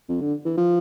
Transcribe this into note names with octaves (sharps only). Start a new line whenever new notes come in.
F2
D3
E3
F3